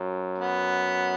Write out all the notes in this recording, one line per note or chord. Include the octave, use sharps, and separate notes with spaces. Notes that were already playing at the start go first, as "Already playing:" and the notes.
Already playing: F#2
B3